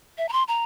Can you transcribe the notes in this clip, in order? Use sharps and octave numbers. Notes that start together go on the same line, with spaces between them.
E5
A#5
C6
A#5